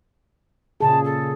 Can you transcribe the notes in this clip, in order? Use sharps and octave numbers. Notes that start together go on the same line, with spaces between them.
A#2 C#3 G#4 A5
A4